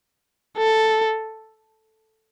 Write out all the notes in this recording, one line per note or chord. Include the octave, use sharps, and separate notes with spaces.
A4